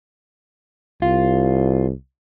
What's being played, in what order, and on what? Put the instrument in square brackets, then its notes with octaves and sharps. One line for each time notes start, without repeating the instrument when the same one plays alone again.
[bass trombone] C2 [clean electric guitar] F4